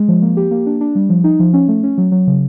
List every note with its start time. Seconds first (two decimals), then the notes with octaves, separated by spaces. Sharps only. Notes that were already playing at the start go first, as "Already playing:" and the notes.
Already playing: G#3
0.08 F3
0.22 A#3
0.37 G4
0.51 A#3
0.66 D4
0.81 D4
0.95 G3
1.09 F3
1.24 D#4
1.40 F3
1.53 C#4
1.68 A3
1.83 C#4
1.98 F#3
2.12 F#3
2.27 C#3